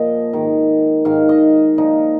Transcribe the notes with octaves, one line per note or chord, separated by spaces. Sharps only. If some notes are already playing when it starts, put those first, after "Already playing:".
Already playing: A#2 F3 D#5
G#2 D#3
G#2 D#3 F5
D#5
A#2 F3 D#4